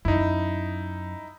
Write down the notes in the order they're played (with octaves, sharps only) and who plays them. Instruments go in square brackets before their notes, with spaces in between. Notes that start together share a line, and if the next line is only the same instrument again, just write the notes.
[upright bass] F#2 F#3 [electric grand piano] D#4 E4